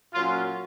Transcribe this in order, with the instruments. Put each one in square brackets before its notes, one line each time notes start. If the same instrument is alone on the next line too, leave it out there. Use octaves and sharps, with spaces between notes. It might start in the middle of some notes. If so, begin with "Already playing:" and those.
[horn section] A#2 F#3 A#3 C#4 F4